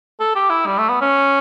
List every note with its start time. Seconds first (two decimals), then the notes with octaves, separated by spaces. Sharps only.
0.20 A4
0.35 G4
0.50 E4
0.66 G3
0.78 A3
0.89 B3
1.01 C#4